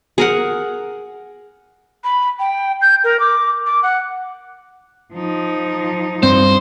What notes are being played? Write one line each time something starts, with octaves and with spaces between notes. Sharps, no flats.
G#4 A#4 F#5
B5
G5
G6
A#4
D6
D6
F#5
F3 D#4
G2 C4 C5